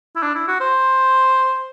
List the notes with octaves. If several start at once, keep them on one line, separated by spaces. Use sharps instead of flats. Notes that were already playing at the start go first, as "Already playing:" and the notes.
E4
D4
E4
F#4
C5